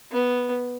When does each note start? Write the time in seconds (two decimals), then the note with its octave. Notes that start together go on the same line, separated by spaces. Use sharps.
0.11 B3